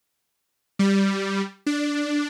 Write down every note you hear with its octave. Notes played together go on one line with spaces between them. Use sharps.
G3
D4